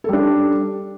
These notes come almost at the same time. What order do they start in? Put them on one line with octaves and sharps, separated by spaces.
A4 G3 D4